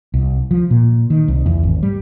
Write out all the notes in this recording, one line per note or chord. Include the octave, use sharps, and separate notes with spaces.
C2
F3
A#2
D#3
C2
E2
G#1
G3